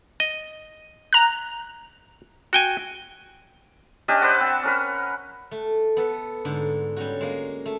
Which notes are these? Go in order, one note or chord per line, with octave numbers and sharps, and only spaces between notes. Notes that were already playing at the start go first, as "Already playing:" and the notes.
D#5
A#5 F#6
F#4 G5 G#5
C#4 D4 G4 D#5
B4 C5 D5 F#5
C4
C#4 A#4 B4
A3
B3 A4 B4
G#2 D3
G3 C#4 F#4
G#3 A#3
A3